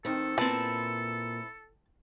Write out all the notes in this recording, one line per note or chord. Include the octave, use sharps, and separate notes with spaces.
D#3 C4 A4
A#2 C4 E4 B4 A5